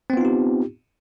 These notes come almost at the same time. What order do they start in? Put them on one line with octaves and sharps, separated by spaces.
C4 B3 F4 D#4 G4